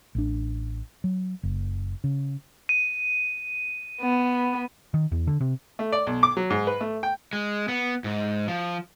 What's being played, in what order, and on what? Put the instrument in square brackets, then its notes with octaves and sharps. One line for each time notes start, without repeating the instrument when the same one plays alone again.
[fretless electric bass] A1 D4
F#3
F#1
C#3
[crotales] D#7
[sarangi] B3
[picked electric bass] D#3
E2
D3
C3
[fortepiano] A3
D5
B1
D6
F#3
G#2
B4
A3
G5
[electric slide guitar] G#3
B3
G#2
F3